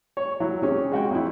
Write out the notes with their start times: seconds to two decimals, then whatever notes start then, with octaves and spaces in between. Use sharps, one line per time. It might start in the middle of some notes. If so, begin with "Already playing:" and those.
0.17 C#5
0.40 F#3 E4
0.62 C3 C#4 G#4
0.92 G#3 F#4 G5
1.11 F2 E4